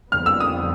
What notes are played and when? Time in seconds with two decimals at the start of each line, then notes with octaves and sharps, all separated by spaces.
0.12 F2 D3 G3 B3 F6
0.26 E6
0.40 D#6